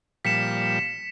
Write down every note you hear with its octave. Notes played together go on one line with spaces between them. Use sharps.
A#2 F3 G3 B6 C#7 E7